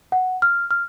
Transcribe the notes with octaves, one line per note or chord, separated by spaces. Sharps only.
F#5
F6
F6